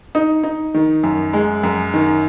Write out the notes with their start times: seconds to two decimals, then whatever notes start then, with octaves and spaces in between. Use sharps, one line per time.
0.15 D#4
0.43 D#4
0.74 D#3
1.03 F#2
1.33 G#3
1.63 F#2
1.94 D#3